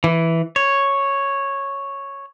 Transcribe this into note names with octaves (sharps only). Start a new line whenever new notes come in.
E3
C#5